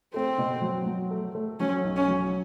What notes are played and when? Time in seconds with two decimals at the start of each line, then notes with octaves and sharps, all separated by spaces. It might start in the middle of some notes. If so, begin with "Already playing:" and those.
0.14 A3 C4
0.38 B2
0.62 F#3
0.86 F#3
1.11 A3
1.35 A3
1.60 F#3 C#4
1.84 B1
1.96 C#4
2.08 F#3